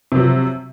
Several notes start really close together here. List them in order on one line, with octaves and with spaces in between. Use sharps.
C3 F#3 F3